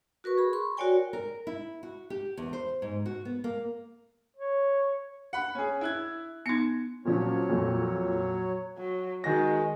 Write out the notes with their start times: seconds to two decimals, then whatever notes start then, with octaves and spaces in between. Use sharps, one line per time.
0.24 F#4 A#4 B4 C#6
0.38 G#4 B5
0.53 C6 C#6
0.77 F#4 A#4 C#5 D5 G5 G#5
1.13 A#4
1.47 E4
1.83 F#4
2.10 G4
2.37 E2
2.53 C5
2.82 G#2
3.06 F#4
3.25 B3
3.44 A#3
4.37 C#5
5.33 F#5 B5
5.55 C#4 G#4
5.81 E4 F#6 G#6
6.46 B3 D#4 G#6 C#7
7.05 A#2 F3 F#3 C#4 C#5
7.50 F2 A#2
8.78 F#3
9.24 D#3 G#3 F#4 A#6